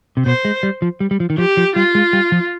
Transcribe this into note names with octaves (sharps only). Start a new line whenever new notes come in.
C3
B2 C5
G#3
G3
F3
G3
G3
F3
D#3
F3 G4
F3
G3 F4
G#3
G3
F3